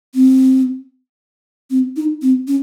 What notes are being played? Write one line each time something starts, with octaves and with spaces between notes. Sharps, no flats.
C4
C4
D#4
C4
C#4